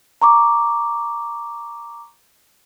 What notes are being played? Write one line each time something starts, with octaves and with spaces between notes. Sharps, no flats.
A#5 C#6 D6